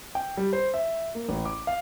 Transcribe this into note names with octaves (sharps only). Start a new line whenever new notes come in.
G5
G3
C5
E5
A#3
A1
D6
F5